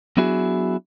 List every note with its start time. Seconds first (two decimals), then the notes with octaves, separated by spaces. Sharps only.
0.17 F#3 B3 D4 E4 F#4 G#4